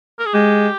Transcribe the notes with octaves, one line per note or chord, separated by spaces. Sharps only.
A#4
G#4
G#3 G4